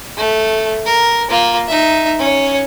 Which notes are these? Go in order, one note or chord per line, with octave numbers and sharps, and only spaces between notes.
A3
A#4
A#3 F4
D#4 E5
C#4 C#5